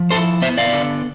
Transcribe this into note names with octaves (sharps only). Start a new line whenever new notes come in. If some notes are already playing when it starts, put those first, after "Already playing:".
Already playing: F3
E4 A4 C5
B3 C5 E5
D5 F5
D3